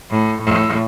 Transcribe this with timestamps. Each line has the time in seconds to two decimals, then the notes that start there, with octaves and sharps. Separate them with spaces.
0.11 A2
0.41 A2